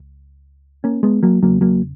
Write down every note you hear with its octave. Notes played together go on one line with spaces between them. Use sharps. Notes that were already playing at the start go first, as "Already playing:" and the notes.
Already playing: C#2
A#3 C#4
G#3 B3
F#3 A#3
E2 C#3 F#3 A#3
F#3 A#3